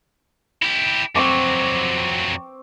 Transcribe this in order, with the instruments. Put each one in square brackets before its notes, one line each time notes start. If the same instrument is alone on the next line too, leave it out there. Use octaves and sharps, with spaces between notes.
[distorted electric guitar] E4 G4
[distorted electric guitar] F2 F#3 [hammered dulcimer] C4 C#6 D6